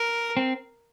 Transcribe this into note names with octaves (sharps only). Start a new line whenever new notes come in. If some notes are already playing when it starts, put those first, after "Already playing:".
Already playing: A#4
C4